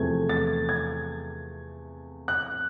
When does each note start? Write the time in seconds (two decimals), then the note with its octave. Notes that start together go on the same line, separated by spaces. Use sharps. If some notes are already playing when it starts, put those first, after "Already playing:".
Already playing: E2 C3 F3 A3 G#6
0.29 A6
0.69 G#6
2.28 F#6